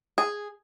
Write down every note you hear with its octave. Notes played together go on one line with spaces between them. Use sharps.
G#4